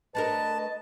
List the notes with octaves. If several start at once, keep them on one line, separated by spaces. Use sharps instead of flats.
A3 D4 A#4 B4 D#5 A5